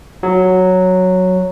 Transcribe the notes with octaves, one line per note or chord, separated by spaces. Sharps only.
F#3